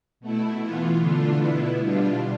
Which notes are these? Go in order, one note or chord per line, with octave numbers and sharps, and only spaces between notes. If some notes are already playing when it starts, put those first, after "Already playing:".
B2 A3 E4
E3 B3 F4
D3 A3 D4 F4
B2 B3 E4
B2 G3 D4 F4